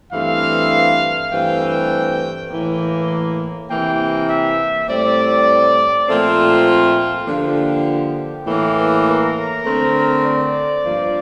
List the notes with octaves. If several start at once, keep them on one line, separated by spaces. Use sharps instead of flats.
G2 E3 A3 C4 F5
G2 E3 A3 C4 G5
A2 E3 A#3
C3 E3 A#3 G5
E5
A2 G3 C4 D5
A#2 F3 A3 C4 F4
D3 F3 A#3 G4
A2 E3 A#3
A#4
D3 A3 C4
D5
G2 F3 A#3